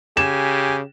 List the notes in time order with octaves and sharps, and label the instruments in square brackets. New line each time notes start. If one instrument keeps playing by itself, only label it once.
[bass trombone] C#3 [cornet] G4 [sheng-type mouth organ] G#5 [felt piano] E7